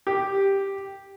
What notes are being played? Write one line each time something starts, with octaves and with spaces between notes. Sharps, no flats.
G4